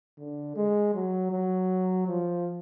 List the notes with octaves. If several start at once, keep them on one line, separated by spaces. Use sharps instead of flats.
D3
G#3
F#3
F#3
F3